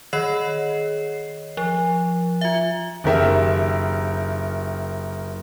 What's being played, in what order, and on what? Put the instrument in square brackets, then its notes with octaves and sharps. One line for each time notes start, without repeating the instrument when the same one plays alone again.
[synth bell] D#3 C#5 D#5 C7
F3
F4 E5
[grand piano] F#1 D#3 G4 A#4 E5